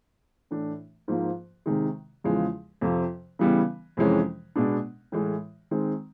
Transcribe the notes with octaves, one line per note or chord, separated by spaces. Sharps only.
A2 E3 A3 D4
G#2 F3 A#3
C3 D#3 G#3
E2 C#3 F3 G#3
F2 C3 F3
C#3 E3 G3 B3
F2 C3 E3 G#3 C#4
B2 G#3 B3 D4
A2 E3 G#3
D#3 G#3 C4